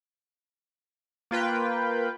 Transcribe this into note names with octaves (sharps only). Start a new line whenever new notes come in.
A#3 F4 B4 G5